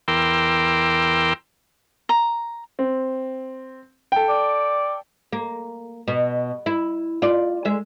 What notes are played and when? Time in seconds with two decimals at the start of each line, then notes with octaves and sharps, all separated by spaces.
0.08 E2 A#4 G5 C6 D6 E6
2.09 A#5
2.79 C4
4.12 A4 G5
4.29 D5
5.32 A#3
6.08 B2
6.66 E4
7.22 F4 D5
7.65 G#3 E5